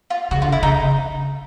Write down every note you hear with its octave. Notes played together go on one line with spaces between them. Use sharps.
F4
C#3 F#4
D3 F4
C#3 E4
C#3 D#4